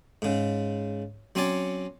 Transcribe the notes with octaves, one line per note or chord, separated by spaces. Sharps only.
G#2 C#3
F#3 C4 C#4 C#5 D5